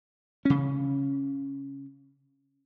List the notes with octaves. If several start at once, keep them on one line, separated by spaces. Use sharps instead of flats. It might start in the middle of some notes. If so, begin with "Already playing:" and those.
C#3 C#4